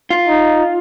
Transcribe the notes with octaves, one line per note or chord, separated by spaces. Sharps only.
F4
D#4